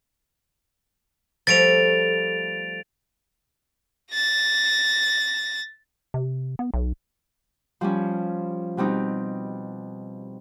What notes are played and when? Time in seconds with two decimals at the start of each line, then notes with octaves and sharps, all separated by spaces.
1.47 F3 G3 A3 A6 D7 F7
4.13 A6 A#6
6.14 C3
6.59 B3
6.74 B1
7.81 F3 G3 C#4
8.77 B2 G3 C4 D#4